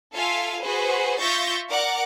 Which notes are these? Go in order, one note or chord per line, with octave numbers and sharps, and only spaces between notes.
F4 A4 E5 F5 G#5
F#4 G#4 B4 C5
F4 E5 C#6 G6 A6 A#6
A#4 D5 F#5 D6